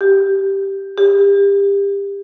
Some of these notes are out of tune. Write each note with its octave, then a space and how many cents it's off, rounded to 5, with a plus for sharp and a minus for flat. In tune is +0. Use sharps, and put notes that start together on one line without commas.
G4 +0
G4 +25